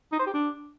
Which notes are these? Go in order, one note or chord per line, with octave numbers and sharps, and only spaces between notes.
D#4
C5
G4
D4